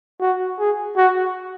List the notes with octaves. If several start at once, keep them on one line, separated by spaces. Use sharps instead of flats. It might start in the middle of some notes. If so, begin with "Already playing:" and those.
F#4
G#4
F#4